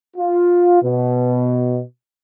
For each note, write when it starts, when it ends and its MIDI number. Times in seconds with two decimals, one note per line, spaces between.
0.17 0.81 65
0.83 1.82 47